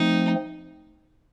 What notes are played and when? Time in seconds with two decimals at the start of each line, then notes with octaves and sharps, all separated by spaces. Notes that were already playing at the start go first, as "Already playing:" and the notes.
Already playing: F3 A3 C4 D#4